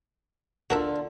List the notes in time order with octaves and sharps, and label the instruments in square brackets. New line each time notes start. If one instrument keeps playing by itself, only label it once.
[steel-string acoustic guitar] D3 F4 [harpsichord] F#4 A#4 E5